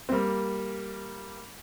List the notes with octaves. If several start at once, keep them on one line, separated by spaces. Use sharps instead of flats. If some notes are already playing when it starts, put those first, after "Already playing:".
C4
G3 A#3